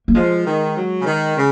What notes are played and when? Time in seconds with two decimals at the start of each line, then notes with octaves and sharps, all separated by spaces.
0.08 A#3
0.15 F3 G#3
0.46 D#3
0.76 F#3
1.00 C#3
1.06 D#3
1.37 C#3